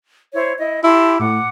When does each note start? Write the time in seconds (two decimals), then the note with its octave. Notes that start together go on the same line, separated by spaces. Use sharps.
0.33 E4 C5 C#5
0.58 E4 D#5
0.83 E4 G4 A5 C6
1.19 A2 F#5 D6